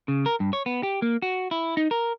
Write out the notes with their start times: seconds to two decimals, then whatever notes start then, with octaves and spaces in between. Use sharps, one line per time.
0.08 C#3
0.26 A#4
0.40 G2
0.53 C#5
0.66 B3
0.83 G4
1.02 A#3
1.22 F#4
1.51 E4
1.77 D#4
1.91 A#4